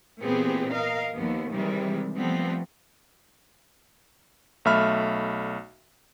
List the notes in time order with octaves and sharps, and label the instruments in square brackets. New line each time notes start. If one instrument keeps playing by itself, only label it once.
[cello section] A#2 E3 B3 C4 G4 G#4
A#4 D#5 F5
D#2 F3 B3
C3 D#3 E3 G3 G#3
F3 G3 A3 B3 C4
[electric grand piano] B1 A3 E5 B5 F6